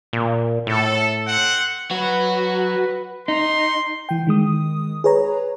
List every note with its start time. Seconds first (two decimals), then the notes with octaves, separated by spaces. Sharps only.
0.13 A#2
0.67 A2 A4
1.26 C4 F#5
1.91 F#3 F#4 B4
3.28 D#4 C6
4.09 E3 G5
4.27 D#3 G#3 D#6
5.04 G#4 B4 C#5 A#5